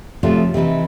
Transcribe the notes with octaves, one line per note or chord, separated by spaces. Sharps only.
C3 F3 F#3 A3 F4
C3 E3 D#4 E4